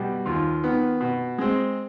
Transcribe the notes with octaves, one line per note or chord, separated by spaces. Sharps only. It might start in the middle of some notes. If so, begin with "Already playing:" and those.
Already playing: B2 G3
D#2 F4
D#3 B3
B2
G#3 C4